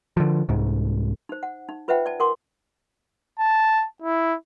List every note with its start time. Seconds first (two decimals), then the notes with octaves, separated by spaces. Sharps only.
0.17 D3 F3
0.49 C2 G#2
1.29 D#4 C5
1.43 F#5
1.69 D#4
1.88 F4 B4 C5 E5 F#5 G5
2.06 D5 A5
2.20 A#4 F#5 G#5 C6 D6
3.39 A5
4.02 E4